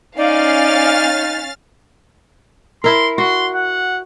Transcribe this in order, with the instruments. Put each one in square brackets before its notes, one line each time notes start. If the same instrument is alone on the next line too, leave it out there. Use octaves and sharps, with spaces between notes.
[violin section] C#4 F5 [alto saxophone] D#4 [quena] D5 [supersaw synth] F6 A6
[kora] E4 A#4 [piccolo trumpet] C6
[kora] F#4 [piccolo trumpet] C6
[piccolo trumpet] F#5